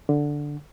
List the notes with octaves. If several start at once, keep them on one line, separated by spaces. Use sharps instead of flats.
D3